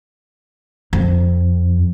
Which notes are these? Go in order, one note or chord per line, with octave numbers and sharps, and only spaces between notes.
F2